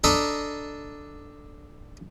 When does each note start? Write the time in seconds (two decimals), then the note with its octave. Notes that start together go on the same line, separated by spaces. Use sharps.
0.04 D4 A4 D#5 A#5 B5